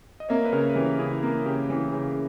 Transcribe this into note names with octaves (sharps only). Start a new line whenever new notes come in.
D#5
A#3 C#5 E5
B4
C#3 A#4 C#5
B4
E3 G4 A#4
C#3 E4 G#4
A#3
C#3 G4 A#4
E3
C#3